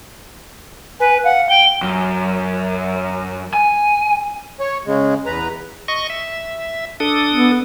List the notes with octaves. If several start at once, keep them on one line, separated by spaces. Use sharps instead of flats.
B4 G#5
F5 F#5
G5 G7
F#2
G#5
C#5
C#3 G#3
E2 B4 A#5
D#5 C#6
E5
D4 A4 D#6
B3